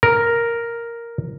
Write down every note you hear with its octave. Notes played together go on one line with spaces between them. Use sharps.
A#4